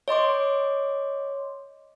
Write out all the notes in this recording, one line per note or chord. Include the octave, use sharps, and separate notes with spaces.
C#5 D#5 C6 D6